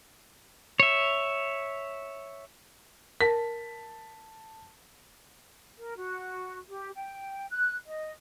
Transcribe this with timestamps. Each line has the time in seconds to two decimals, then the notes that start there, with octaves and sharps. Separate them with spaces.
0.80 C#5 E5
3.21 A#4 A5 B6
5.78 A#4
5.96 F#4
6.69 G4
6.95 G5
7.51 F#6
7.86 D#5